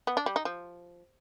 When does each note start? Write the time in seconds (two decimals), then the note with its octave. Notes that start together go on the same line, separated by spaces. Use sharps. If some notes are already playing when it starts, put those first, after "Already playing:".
0.07 B3
0.17 D4
0.26 G3
0.36 D#4
0.45 F3